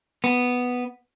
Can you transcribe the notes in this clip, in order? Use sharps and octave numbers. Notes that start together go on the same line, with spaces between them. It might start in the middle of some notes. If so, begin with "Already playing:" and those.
B3